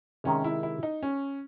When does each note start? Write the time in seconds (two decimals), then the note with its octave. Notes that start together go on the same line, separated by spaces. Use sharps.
0.24 C3 D#3 G#3 C#4
0.44 E4
0.63 E4
0.83 D#4
1.03 C#4